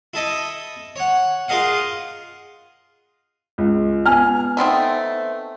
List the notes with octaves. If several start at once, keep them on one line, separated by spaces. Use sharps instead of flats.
E4 A4 D#5
C#5 F#5
F4 G#4 A#4 D#5 F5 F#5
C#2
B3 G#5 F6
A3 B3 C4 D#4